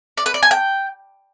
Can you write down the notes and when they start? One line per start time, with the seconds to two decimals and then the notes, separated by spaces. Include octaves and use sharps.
0.17 D5
0.26 B4
0.34 D5
0.43 G#5
0.51 G5